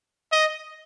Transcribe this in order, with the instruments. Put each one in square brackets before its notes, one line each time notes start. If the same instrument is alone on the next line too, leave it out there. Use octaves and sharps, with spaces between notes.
[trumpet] D#5